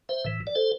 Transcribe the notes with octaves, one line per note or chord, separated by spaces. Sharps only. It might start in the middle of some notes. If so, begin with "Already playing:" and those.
C5 E5
A2 E3
D5
A4 C5